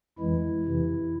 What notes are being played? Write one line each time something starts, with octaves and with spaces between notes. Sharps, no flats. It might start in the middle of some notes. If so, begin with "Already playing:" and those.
F2 E3 G#3 E4
F2 C3 E3